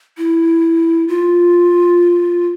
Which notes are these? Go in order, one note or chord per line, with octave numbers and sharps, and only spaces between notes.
E4
F4